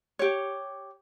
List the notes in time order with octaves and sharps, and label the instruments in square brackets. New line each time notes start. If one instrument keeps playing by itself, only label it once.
[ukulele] G4 C#5